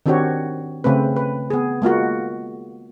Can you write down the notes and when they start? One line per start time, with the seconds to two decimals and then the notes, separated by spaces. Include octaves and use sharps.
0.06 D#3 C4 D4 F#4 G4 C#5
0.84 C#3 A3 C4 B4
1.16 B4
1.50 B3 G#4
1.82 G#3 A#3 F4 F#4